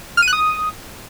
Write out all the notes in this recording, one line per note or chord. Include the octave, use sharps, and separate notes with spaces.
F6
D#7
F#6
D#6